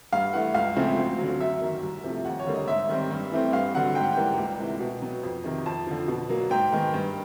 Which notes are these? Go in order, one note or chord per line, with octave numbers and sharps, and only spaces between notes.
G2 F5
E3 A3 F#5
C#2 F5
C#3 F3 A3 C4
D2
D3 F#3
F#2 E5
D#3 F#3 A#3
C2
C3 F3 A3
D#2 F#5
C#5
D3 G3 A#3
D#5
G#2 E5
D#3 G3 C4
G2
E3 A3 C4
G2 F5
D3 F#3 F#5
G#2 G5
F#5
E3 G3 A#3 G5
C#2
C3 E3 A3
B2
F#3 B3
F2
C3 D#3
F2 A5
D3 F3
B2
F#3 A#3
G#2 G5
D#3 G#3 B3
G2